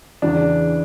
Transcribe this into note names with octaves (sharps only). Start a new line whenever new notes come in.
E2 C#3 E3 D4